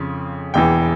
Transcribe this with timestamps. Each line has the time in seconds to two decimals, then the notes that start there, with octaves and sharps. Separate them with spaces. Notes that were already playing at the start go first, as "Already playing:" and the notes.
Already playing: F2 C#3 F3
0.54 E1 E2 E3 G5